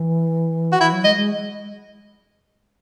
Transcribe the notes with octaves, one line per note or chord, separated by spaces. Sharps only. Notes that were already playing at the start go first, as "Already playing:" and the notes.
Already playing: E3
F#4
E3 E4
F#3
G#3 D#5
G#3